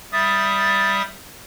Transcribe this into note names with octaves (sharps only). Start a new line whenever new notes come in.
G3 E5 D#6 A6